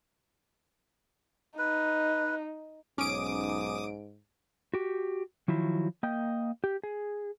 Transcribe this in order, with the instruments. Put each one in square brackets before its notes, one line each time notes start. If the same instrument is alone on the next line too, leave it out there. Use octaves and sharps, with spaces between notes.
[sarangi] D#4 [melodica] B4
[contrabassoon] B1 [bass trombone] G#2 [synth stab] C#4 D7 [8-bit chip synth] D6 D#6
[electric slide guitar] F#4 G4
D#3 F3 F#3 E4
A#3 D#5 G5
G4
G#4